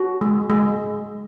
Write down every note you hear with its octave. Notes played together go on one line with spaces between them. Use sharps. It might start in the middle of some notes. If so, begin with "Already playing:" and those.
Already playing: F#4
G#3
G#3